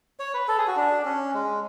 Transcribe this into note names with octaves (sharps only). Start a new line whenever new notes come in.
C#5
B4
A4
G#4
F#4
D4
C#4
G#3